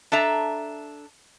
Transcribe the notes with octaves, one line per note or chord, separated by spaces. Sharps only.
D4 A4 E5 A#5